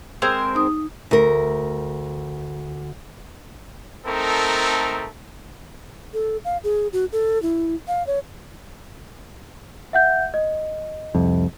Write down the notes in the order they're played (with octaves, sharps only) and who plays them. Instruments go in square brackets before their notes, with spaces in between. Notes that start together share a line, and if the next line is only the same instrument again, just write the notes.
[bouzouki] G#3 C4 A#4 [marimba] E6 G#6
[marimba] D#4 D#6
[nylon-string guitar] D2 A#4
[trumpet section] A3 C4 D#4 A4 A#4
[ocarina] A4
F5
G#4
F#4
A4
E4
F5
C#5
[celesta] E5 F#5 G6
D#5
[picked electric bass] C2 F2